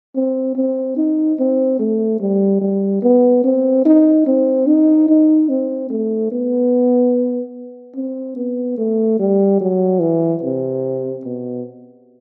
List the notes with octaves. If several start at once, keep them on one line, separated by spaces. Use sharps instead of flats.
C4
C4
D#4
C4
A3
G3
G3
B3
C4
D#4
C4
D#4
D#4
C4
A3
B3
C4
B3
A3
G3
F#3
E3
C3
B2